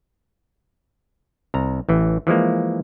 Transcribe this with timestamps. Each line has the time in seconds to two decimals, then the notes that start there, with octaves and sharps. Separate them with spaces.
1.54 C2 A#5
1.89 A1 E3
2.27 E3 F3 G#3 A#3